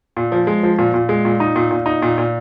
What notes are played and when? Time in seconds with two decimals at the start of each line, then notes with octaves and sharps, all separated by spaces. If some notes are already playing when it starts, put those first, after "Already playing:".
0.17 A#2
0.32 F3
0.47 G#3
0.63 F3
0.79 A#2
0.94 A#2
1.09 G#3
1.25 A#2
1.40 D#4
1.56 A#2
1.71 A#2
1.86 D#4
2.02 A#2
2.18 A#2